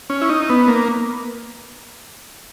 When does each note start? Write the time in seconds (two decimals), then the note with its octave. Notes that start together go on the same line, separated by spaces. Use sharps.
0.10 C#4
0.22 E4
0.29 D#4
0.50 B3
0.68 A#3